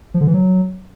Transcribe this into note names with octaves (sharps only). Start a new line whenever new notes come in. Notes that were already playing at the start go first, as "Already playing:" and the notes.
F3
D3
E3
F#3